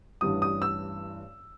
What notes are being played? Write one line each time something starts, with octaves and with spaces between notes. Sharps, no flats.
A1 G2 E3 G3 D#6
D#6
E6